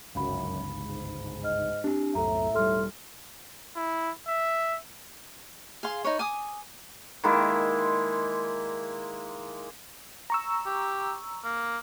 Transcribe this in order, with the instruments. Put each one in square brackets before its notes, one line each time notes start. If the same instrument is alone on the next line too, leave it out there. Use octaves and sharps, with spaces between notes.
[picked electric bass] G1 C#2 [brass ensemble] F#2 [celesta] F5 B5
[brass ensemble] G#2
[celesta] D#5 F6
[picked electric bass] C4 D4 [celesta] G4
[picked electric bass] C2 F#2 [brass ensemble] A2 E5 [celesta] A4 A#5
[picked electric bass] E1 G3 [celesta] A4 C6 F6
[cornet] E4
E5
[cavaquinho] G#4 F5 C6
D#4 B4 C#5
G#5 D6 D#6
[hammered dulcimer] D#3 G#3 A#3 E4
[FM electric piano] A#5 C#6 E6
[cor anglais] G4
A#3